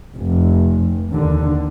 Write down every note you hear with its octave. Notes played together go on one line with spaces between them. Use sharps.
F1
D#2 D3